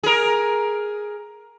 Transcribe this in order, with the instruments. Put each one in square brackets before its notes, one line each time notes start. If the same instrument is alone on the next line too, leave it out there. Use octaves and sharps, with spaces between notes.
[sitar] G#4 A#4